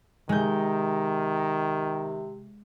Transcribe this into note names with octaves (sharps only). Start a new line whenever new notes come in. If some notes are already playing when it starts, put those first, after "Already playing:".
C3 D#3 G#3 G6